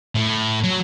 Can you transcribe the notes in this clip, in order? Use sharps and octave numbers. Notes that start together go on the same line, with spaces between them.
A2
F#3